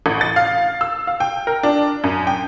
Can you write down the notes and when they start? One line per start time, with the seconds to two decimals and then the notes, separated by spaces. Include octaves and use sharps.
0.06 A1
0.21 A6
0.36 F5
0.81 E6
1.07 F5
1.20 G5
1.47 A#4
1.63 D4
2.04 F#2
2.27 G5